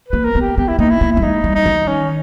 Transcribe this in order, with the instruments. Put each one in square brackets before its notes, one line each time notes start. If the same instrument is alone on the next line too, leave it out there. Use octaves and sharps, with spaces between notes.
[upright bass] A#3 [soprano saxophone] B4
[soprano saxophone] A#4
[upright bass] B3
[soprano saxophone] G4
[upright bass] B3 [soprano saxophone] G4
[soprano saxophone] E4
[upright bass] A#3 [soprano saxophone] D#4
[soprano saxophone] E4
[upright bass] A#3
[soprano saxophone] E4
[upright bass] G3
[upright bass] G#3 [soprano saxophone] D#4
[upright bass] G3
[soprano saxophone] D#4
[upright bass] D#3
[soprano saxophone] C#4